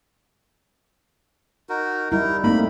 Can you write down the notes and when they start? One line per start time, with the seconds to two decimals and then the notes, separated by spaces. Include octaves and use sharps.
1.69 D#4 F#4 A#4
2.12 G3 D#4 E4 A#4
2.44 A3 A#3 C4 D#4 B5